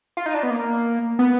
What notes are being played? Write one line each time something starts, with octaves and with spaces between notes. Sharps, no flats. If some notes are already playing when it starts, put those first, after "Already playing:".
F4
D#4
D4
B3
A#3
B3